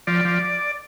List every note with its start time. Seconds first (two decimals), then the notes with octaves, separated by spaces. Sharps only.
0.07 F3 D5
0.25 F3